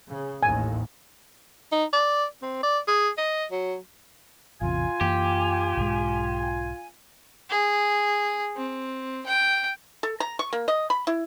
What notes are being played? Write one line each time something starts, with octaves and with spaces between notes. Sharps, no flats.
C#3
A1 D#2 A2 G#5
D#4
D5
C4
D5
G#4
D#5
F#3
A1 E2 C3 F4 G#5
F#2 E3 A#3 G4
B1 G#2 G#3
G#4
C4
G5
A4
A#5
C#6
A#3
D#5
B5
E4